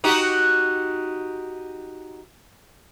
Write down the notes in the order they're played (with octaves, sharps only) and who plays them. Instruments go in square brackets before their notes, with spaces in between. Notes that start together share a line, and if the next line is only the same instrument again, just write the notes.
[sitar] D#4 F#4 G4